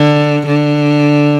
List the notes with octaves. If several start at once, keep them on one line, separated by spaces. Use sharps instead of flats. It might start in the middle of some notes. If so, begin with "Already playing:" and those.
Already playing: D3
D3